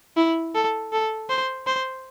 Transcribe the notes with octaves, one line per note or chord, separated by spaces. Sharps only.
E4
A4
A4
C5
C5